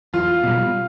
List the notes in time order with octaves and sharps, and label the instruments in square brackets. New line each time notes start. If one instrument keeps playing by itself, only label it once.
[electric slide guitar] E2 [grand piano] F4
[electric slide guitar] B2 G3